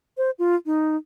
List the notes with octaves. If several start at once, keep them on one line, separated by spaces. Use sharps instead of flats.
C5
F4
D#4